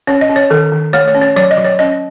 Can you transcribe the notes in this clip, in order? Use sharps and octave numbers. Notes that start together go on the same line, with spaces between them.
C#4 C#5
D#5
C#4
C#5
D#3 A4
D#3
A3 C#5
C#5
C#4
C#5
F#3 C#5
D#5
F#3
C#5
C#4 D#5